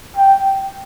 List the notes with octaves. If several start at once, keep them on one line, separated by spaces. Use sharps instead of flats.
G5